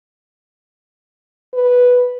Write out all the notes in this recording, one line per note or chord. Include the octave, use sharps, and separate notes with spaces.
B4